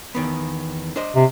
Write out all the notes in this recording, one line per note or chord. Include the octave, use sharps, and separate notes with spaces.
E2 D#3 B3
D4 C5 D#5
C3